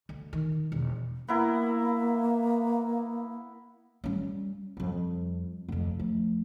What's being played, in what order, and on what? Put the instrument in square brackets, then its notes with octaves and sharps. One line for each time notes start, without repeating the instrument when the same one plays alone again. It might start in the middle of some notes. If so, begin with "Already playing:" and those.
[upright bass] D2
D#3
E1
[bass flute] A#3 [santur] B3 E4 A#4
[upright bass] G3 C#4
F2 G3
F1 F2
F3 A3